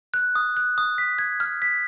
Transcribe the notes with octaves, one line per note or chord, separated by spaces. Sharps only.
F#6
D#6
F#6
D#6
B6
G#6
F6
B6